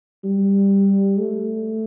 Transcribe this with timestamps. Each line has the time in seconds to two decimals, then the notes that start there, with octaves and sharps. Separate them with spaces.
0.24 G3
1.19 A3